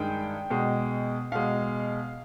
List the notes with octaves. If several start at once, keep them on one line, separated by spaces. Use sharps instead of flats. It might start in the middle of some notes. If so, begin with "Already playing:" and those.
Already playing: G2 D#3 G#3 G5
B2 G#3
B2 G#3 F5